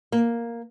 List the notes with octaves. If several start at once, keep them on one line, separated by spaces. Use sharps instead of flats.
A#3